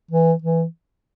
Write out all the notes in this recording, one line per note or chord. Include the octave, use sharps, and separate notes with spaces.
E3
E3